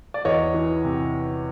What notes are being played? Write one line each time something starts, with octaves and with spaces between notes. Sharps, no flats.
D5
E2 C#5 D#5
E3
C3